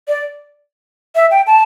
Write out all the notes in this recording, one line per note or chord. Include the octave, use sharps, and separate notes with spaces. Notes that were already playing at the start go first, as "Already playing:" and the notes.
D5
E5
G5
A5